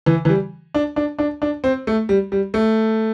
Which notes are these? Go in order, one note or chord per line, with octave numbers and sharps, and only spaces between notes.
E3
E3
G3
D4
D4
D4
D4
C4
A3
G3
G3
A3